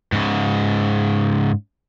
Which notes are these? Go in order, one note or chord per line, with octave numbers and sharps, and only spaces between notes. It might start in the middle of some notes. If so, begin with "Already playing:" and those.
G#2 C#3